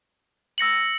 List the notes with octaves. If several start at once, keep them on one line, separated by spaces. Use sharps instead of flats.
E6 A#6 C#7 F#7